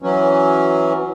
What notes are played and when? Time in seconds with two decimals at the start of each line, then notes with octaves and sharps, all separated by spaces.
0.02 E3 F#3 C#4